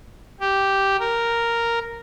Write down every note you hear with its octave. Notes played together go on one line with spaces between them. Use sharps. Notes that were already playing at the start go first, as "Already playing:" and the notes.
G4
A#4